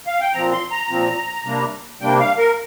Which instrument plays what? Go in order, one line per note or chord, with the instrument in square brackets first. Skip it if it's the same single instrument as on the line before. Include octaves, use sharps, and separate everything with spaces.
[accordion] F5
G5
A#2 F3 C4 A#5
C6
A#5
A#2 F3 C4
C3 G3 A#3 D4
C3 G3 A#3 D4 G5
F5
A#4